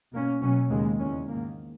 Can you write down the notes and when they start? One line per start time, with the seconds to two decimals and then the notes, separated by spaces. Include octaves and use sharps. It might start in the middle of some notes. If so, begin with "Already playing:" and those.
0.11 B2 A#3 C#4
0.41 B2 F#3 C#4
0.70 D#2 C#3 G#3
0.99 E2 C#3 G#3 C#4
1.28 G#2 D#3 A#3